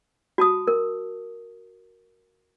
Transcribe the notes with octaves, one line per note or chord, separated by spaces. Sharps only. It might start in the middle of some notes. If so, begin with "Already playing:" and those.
F#4 A5 D#6
A#4